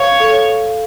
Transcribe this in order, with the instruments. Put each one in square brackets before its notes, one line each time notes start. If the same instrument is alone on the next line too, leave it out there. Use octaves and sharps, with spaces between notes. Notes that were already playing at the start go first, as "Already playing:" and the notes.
Already playing: [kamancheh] C#5 [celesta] F5
[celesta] A4